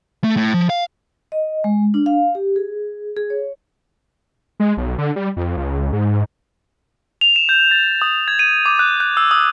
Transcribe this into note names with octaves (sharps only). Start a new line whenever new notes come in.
A3
A2
F3
F5
D#5
G#3
D4
F5
G4
G#4
G#4
C#5
G#3
B1
D3
G3
F2
C#2
G#2
F7
E7
G6
A6
D#6
G#6
D#7
D6
F#6
F#6
E6
D#6